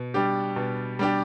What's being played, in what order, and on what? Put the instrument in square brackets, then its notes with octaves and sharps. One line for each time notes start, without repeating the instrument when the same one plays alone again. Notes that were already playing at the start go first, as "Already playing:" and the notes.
Already playing: [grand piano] B2
G3 D4 G4
B2
G3 D4 G4